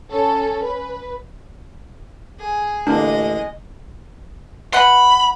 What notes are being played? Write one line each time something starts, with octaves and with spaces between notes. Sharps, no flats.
C#4 A4
B4
G#4
A1 D3 G#3 A#3 D4 D#5
B2 B4 F#5 B5 C6